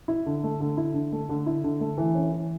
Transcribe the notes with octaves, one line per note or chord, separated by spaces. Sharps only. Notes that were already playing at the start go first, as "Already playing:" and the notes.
E4
D3
A3
D3
E4
D3
A3
D3
E4
D3
A3
E3
C#4
E3